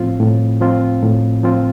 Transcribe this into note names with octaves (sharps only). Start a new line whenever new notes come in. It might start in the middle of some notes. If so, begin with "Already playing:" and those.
Already playing: A2 F3 C4 F4
A2
F3 C4 F4
A2
F3 C4 F4